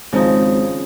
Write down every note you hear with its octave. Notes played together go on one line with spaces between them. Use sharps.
G#1 C#3 F3 D#4